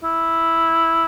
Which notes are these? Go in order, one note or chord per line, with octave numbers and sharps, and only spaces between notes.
E4